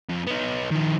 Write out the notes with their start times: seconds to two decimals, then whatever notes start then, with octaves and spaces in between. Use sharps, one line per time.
0.09 F2
0.27 B3 D#4
0.72 D#3 F3